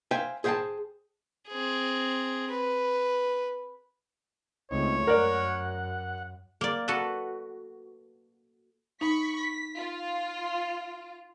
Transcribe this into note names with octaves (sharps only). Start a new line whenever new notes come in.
C5 E5 F5 G5 G#5
G#4 C5 E5 F5 G5 A5
C4 G#4
B4
C#2 A3 C4 D#4 C#5
F#2 A#4 D5 F#5
A#3 D5
F#4 A4 B4
D#4 B5 C#6 B6
B6
F4